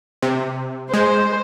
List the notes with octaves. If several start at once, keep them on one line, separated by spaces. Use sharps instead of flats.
C3
G#3 C5